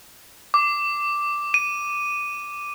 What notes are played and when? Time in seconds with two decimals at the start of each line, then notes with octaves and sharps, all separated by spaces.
0.54 D6
1.54 D#7